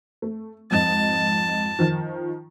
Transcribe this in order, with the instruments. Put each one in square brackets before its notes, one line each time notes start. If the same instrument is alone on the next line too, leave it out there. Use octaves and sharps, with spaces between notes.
[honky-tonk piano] A3
[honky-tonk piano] F2 G#2 D#5 [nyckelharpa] A5
[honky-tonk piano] D#3 F3